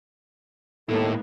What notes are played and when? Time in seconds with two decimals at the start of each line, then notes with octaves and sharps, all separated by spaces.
0.89 D#2 A2 D#3 G#3 A#3 B3 E4 A4